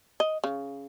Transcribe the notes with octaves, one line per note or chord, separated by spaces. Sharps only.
D#5
C#3